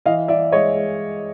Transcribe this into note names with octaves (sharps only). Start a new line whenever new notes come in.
E3 D#5 F5
E3 D5 E5
G#3 C#5 D#5
G#3